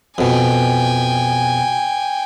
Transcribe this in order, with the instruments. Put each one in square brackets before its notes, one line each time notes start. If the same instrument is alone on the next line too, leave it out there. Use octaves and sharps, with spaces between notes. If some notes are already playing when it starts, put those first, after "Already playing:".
[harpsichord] F2 B2 [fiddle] G5 G#5